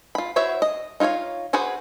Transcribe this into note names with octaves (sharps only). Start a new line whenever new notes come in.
F4 B5
E4 F#4 C5 C#5 E5
D#5
D#4 F4 G#4 C#5 F5
F#4 G#4 B4 C5 F#5